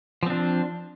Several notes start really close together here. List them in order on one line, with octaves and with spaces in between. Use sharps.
F3 C4 D4